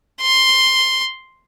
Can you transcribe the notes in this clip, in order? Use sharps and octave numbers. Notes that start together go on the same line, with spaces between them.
C6